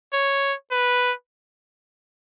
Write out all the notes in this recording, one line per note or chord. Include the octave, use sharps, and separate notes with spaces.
C#5
B4